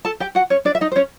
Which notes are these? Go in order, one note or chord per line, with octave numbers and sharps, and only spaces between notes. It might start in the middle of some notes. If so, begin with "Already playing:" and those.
A4 A5
G4 G5
F#4 F#5
C#4 C#5
D4 D5
E5
D#4 D#5
C5
C#4 C#5